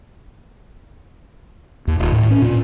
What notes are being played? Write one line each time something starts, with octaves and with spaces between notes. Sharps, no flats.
D#2
D#1
A2
C#4
A#2